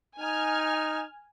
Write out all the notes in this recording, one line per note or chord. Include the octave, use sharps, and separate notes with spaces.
D#4 G#5 F6